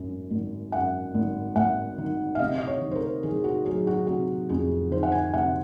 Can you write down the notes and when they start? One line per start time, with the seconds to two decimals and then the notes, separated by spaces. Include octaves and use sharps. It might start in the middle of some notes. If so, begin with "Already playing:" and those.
Already playing: G#1 F#2
0.31 G#1
0.72 F#2 F#5
1.14 G#1
1.56 G#1 F#5
1.98 D#3
2.35 F5
2.39 C3 D#5
2.58 D#5
2.67 C#5
2.82 D#3
2.91 C5
2.95 A#4
3.23 D#3 G#4
3.44 F#4
3.65 F#3 G#4
3.87 F#4
4.07 C3 F#4
4.49 F2 G#4
4.91 D#3 C5
5.03 F#5
5.12 G#5
5.34 C3 F#5